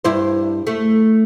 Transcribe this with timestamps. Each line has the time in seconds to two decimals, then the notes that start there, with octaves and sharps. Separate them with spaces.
0.05 G2 E4 C5
0.67 A3